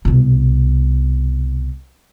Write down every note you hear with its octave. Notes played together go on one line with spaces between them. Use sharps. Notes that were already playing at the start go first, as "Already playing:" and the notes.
C2 B2